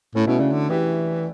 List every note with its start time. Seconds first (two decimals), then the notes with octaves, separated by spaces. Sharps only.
0.15 A2 A3 C#4
0.27 B2 C#4 E4
0.39 C#3 D4 F#4
0.52 D3
0.70 E3 E4 G4